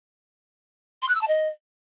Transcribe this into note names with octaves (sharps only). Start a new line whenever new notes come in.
C6
F#6
E6
A5
D#5